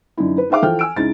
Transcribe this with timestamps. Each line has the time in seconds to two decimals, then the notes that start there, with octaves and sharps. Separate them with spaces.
0.18 F#2 D3 D#4 E4
0.38 B4
0.50 D#4 G#4 E5 F5 D6
0.62 E3 F3 A4 G5 F6
0.79 G#5 E6 D7
0.96 C#2 D#4 E4 A6